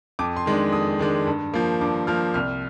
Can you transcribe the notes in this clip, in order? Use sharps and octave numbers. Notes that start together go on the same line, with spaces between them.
F2 D6
C6
D#3 G#3 D4
F2 D#6
D#3 G#3 D4
G2
F3 A#3
G2 D6
F3 A#3 F6
C2 F6